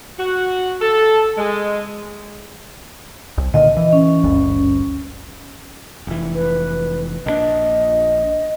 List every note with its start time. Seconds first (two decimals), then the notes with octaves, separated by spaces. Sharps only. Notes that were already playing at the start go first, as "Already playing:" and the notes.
0.19 F#4
0.81 A4
1.38 G#3
3.38 C2
3.54 A#2 D3 D#3 D#5
3.77 E3
3.93 C#4
4.24 G#1 D2 G2
6.07 F1 E3
6.35 B4
7.26 A#1 C#3 D4 D#5